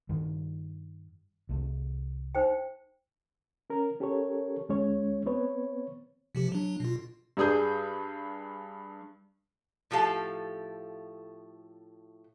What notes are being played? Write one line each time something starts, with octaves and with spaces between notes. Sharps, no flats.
G2 D#3 G3
C2 A3
D#4 C5 G5
C#4 A#4
C#4 G4 A4 A#4 C#5
D2 G#3 C#4 C#5
B3 C4 B4 C#5
C3 F3 G4
F#3 D4
B2 F4
G2 D4 G#4 D#6 G6
A2 F3 G4 A4 F5